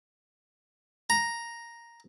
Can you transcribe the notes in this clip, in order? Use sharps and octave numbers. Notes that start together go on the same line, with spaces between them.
A#5